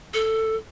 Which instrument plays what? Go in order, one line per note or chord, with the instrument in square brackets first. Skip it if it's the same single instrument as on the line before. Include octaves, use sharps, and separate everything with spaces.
[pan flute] A4